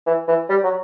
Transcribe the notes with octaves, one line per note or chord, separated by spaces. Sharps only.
E3
E3
G3
F#3